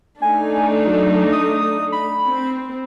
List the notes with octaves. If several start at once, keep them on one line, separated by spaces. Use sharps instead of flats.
A3 D4 D#4 G#5
F#3
D#6
B5
C4